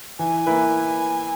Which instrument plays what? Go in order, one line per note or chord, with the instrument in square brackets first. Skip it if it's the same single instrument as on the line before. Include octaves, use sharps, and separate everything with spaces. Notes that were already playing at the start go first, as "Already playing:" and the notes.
[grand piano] E3 [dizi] G#5
[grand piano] A#3 E4 B4